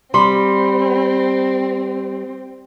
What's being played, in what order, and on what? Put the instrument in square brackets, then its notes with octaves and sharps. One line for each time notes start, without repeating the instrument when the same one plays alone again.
[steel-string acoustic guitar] G3 [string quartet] C4 [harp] B5 C6